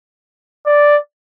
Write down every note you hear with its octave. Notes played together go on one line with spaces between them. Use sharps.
D5